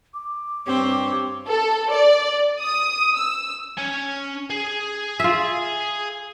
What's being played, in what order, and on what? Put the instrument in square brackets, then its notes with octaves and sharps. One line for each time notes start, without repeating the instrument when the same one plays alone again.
[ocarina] D6
[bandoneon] G2 G4 C#5 [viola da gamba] C4
[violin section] A4
D5
D#6
E6
[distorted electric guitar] C#4 G#5
G#4
[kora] F4 E5